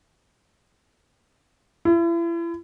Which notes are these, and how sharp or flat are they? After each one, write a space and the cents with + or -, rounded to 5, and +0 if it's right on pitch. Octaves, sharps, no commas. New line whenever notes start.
E4 +35